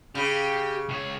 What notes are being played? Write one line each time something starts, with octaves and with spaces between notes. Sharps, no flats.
C#3 G4
C#2 C#5